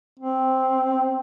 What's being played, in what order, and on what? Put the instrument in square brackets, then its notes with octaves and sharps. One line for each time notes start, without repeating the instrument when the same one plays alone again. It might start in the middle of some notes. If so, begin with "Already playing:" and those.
[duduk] C4